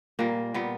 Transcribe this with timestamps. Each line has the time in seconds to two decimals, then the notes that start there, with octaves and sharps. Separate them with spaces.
0.19 A#2 G3 A#3
0.54 A#2 G3 B3